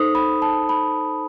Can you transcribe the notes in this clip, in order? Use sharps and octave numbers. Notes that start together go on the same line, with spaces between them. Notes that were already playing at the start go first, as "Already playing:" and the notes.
Already playing: D#4 A4 C5 D#6
B5
A5
B5